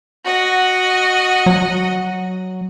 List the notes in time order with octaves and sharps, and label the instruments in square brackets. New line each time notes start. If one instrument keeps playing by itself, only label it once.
[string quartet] F#4 D#5
[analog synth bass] F#3